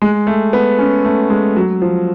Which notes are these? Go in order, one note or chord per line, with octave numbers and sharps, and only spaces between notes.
G#3
A3
B3
C#4
A3
G#3
F#3
F3